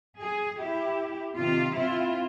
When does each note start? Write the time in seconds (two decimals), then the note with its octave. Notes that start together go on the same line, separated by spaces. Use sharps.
0.20 G#4
0.58 E4 G4
1.37 C3 D#3 F4
1.75 C4 E4 F4